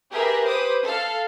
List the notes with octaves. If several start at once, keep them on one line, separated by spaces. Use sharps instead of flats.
G4 G#4 A#4 B4 E5
B4 C5 D6 D#6
A4 F5